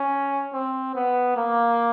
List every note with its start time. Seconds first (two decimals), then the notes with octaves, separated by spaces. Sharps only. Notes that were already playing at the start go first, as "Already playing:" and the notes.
Already playing: C#4
0.53 C4
0.95 B3
1.37 A#3